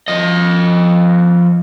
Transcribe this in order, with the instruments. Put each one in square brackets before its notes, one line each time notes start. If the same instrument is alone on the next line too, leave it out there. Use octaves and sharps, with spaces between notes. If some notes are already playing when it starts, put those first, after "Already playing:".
[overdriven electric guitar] F3 D#5